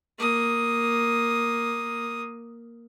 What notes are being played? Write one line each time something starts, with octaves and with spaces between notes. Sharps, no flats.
A#3 D#6